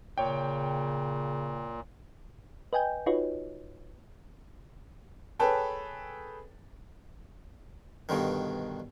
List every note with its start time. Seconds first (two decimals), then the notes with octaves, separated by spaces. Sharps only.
0.18 A#2 C#3 C#5 G5
2.73 B4 D#5 G5 G#5 G6
3.06 D#4 F4 F#4 B4 C#5 D#5
5.39 G#4 A4 B4 C#5 G5 A5
8.09 G2 B2 D3 D#3